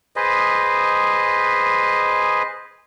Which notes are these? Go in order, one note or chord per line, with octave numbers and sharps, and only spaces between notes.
G#4 B4 C5 D#5